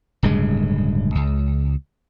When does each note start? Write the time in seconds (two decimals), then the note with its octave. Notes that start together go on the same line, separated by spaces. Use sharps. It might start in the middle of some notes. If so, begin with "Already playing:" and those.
0.23 D1 G2 C#3 G#3
1.15 C#2